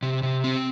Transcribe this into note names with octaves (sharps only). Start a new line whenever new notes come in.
C3
C3
C4